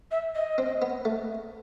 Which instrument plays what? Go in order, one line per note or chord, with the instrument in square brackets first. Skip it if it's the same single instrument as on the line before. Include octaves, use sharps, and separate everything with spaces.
[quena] E5
D#5
[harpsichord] C4
B3
A3